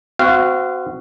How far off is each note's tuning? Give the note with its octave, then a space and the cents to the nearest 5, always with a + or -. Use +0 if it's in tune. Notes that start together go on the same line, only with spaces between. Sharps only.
C4 -25 F#4 +0 F5 -25